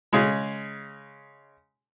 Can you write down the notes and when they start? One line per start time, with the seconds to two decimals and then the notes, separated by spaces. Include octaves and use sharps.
0.13 C#3 G#3